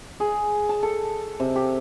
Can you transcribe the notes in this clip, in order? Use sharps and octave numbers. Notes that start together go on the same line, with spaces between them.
G#4
A5
A4
C3
G4